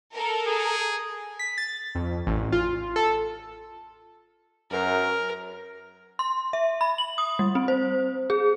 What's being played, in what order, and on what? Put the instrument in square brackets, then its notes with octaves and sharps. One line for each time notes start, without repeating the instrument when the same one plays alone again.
[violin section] A4 A#4
[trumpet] G#4
[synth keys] B6
A6
F2
A1
F4
A4
[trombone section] F#2 [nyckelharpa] A#4
[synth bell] C6
E5
B5
F#7
D#6
G3
C4
C5
G#4